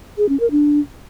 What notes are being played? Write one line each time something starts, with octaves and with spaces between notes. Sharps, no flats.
G#4
C#4
A#4
D4